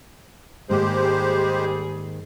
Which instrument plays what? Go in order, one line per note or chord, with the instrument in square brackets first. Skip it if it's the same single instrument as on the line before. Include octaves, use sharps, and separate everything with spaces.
[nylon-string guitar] G#2 D#3 A#3 [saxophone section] G3 G#4 [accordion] G#3 G4 C5